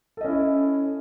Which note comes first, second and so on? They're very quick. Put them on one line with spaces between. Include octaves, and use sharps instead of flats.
A4 D#5 C#4 E4